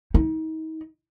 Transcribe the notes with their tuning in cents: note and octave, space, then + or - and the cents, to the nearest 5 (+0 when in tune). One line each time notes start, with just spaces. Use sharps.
D#4 +35